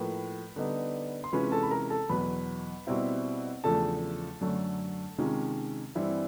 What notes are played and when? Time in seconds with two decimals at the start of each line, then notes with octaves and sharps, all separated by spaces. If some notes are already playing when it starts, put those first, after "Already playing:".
Already playing: A2 F3 A#3 B4
0.56 D3 G3 B3 D#4
1.24 C6
1.33 C3 E3 G#3 C#4 F4 B4 B5
1.52 A4 A5
1.63 B5
1.71 A#4 A#5
1.90 A4 A5
2.09 E2 B2 F#3 B4 B5
2.87 B2 G3 C4 E4
3.64 E2 C#3 F3 A3 D4 A4 A5
4.41 F#2 D3 F#3 A3
5.18 C3 D#3 G#3 C#4 F4
5.95 G2 E3 G3 C4 E4